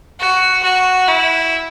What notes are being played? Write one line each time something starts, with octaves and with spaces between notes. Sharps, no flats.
F#4
F#4
E4